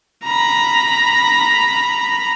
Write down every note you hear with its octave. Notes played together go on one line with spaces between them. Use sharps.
A#5 B5